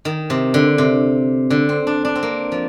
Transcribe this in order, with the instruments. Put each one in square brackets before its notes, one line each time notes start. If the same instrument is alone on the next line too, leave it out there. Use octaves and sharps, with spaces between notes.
[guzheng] D#3
C3
D3
C3
D3
C4
D4
D4
C4
A#3
F3